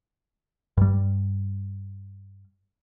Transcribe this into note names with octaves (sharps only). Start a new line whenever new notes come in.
G2 G3